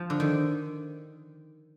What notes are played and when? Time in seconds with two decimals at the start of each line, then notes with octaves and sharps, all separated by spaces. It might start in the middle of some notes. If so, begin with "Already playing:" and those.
Already playing: F3
0.10 D3
0.20 D#3